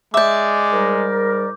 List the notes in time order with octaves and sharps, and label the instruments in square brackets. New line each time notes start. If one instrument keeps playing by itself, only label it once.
[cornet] G#3 [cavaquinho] D5 E5 [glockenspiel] D6 G6
[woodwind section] G#2 G3 A#4